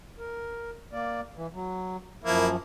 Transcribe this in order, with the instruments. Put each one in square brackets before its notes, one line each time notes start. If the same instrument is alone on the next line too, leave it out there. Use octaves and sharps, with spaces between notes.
[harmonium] A#4
A#3 D5
E3
F#3
[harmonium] F#2 F3 [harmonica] A#3 E4